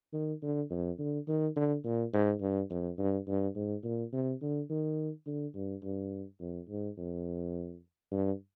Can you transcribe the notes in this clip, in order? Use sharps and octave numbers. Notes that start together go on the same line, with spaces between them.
D#3
D3
F2
D3
D#3
D3
A#2
G#2
G2
F2
G2
G2
G#2
A#2
C3
D3
D#3
D3
G2
G2
F2
G#2
F2
G2